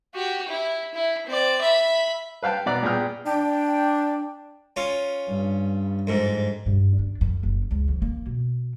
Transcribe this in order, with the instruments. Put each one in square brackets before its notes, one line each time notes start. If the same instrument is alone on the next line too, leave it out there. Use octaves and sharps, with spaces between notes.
[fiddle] F#4 G4
E4
E4
C4 D5
E5 B5
[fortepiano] B4 F5 G5 A5
B2 B4 D5 A#5 F#6
A#2 B3 G#4 G5 F6
[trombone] D4 [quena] G5
[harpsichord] C#4 F4
[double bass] G2
[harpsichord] F2 G#2
[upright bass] G2
D4
F#2
F#1
C#2
F2
A#3
B2